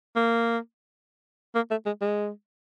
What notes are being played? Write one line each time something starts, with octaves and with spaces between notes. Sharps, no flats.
A#3
A#3
A3
G#3
G#3